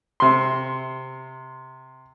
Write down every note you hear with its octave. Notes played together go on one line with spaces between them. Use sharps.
C3 C6